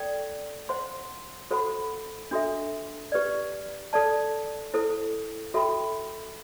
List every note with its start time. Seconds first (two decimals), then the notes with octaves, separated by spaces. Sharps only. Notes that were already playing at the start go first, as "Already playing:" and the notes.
Already playing: A4 D5 G5
0.69 C5 F#5 C6
1.51 F#4 A4 C5 F#5 B5
2.31 D4 F#4 A4 E5
3.12 G4 B4 D5
3.93 A4 D5 A5
4.74 E4 A4 C5
5.54 F#4 A4 E5 G5 B5